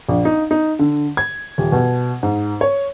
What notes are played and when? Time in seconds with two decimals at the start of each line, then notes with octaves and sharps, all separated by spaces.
0.09 A#1
0.25 D#4
0.51 D#4
0.79 D3
1.17 G#6
1.58 D#1
1.72 B2
2.23 G#2
2.61 C#5